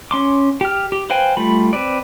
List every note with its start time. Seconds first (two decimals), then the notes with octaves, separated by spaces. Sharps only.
0.11 C#4 C6 D6
0.61 G4 F6
0.92 G4
1.10 B4 C5 F5 G5 G#5
1.37 G3 A3 F4 B5
1.73 C4 B4 D5